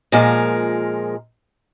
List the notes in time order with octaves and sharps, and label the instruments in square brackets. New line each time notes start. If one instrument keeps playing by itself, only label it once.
[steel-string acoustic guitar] A#2 F3 G#3 A#4